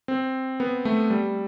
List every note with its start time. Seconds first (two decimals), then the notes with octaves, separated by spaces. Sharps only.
0.08 C4
0.60 B3
0.85 A3
1.10 G3